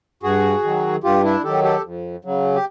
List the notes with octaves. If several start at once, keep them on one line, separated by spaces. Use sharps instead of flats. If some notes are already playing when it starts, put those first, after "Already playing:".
G2 F#4 G#4
D#3 F#3
G2 F4 G4
D4 E4
D#3 F#3 G4 A4
G4 A4
F2
C#3 F#3
G4